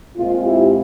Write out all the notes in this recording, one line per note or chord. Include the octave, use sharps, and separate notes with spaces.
A#2 G#3 C4 F4
E4 G4